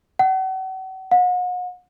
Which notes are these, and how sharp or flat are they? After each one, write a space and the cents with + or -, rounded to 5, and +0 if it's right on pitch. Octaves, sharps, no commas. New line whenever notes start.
F#5 +40
F#5 -40